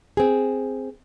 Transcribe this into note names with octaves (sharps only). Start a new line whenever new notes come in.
C4 G#4